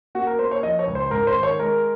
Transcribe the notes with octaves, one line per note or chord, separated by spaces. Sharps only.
A#3 F#4
A#4
A#3 C5
C#5
F3 D#5
C#5
C#2
C5
G#2 A#4
C5
D#3
C#5
G#3 A#4